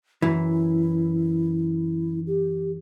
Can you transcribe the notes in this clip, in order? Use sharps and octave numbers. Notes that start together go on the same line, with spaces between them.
F#2 E3 E4
G4